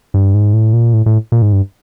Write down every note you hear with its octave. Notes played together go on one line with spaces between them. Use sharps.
G2
G#2
A2
A#2
A2
A2
A#2
G#2
G2